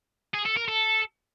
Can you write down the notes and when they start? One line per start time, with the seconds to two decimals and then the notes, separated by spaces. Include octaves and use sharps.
0.34 G#4
0.45 A4
0.57 A#4
0.68 A4